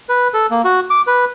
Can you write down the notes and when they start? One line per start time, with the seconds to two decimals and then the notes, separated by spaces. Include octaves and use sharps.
0.09 B4
0.34 A4
0.51 A#3
0.64 F#4
0.90 D6
1.07 B4